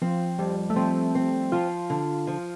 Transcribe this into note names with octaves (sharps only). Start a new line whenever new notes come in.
F3 C4
F2 G3
A3
F3 C4
C4
F3 F4
D3
F3